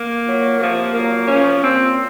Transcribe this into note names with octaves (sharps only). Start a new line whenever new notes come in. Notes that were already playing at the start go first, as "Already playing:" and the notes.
Already playing: A#3
A#2 F#3
C3 F3 A#3
A#2 F#3 A#3
C3 F3 C#4
A#2 F3 C4